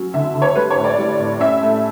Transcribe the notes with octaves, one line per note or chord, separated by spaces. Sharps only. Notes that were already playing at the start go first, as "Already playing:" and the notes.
Already playing: F#3 C#4
D3 E5
D3
C#5
G3 B4
C#5
A2
D5
G3
A2
C#4 E5
A3